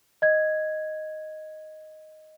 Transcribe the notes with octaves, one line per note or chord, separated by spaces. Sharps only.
D#5 G#6